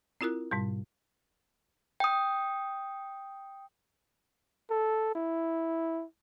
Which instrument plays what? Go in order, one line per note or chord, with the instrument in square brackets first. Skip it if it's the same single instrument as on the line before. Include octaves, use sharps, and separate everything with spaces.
[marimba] C4 E4 F4 A#4 F#6
G#2 B2 G3
[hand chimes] G5 D#6
[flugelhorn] A4
E4